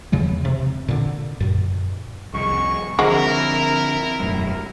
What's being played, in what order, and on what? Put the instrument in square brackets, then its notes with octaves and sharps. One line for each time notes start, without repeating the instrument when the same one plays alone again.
[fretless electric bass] E2 C#3 F3 G#3
C3
A#2 D3
F#2 A#2
[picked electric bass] C2 F2 [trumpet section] G#3 C#6
[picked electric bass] D3 F3 C4 [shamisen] G#3 F#4 [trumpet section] E4 A#4
[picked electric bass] E1 F#2 A2